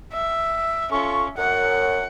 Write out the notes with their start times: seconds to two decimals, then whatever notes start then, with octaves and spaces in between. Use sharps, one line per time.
0.13 E5
0.92 C#4 F4 A4 C#6
1.38 F#2 F#5